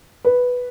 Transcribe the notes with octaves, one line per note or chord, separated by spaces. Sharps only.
B4